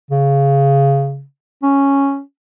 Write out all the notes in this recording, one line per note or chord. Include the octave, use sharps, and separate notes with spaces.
C#3
C#4